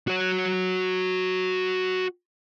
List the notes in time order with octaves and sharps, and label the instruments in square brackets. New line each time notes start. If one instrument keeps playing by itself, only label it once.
[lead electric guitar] F#4 C#5